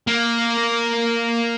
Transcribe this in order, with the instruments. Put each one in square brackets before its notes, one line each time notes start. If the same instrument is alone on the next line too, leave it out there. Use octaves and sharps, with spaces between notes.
[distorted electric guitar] A#3